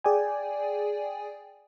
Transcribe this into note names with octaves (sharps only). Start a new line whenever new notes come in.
G#4 D5 G5 G#5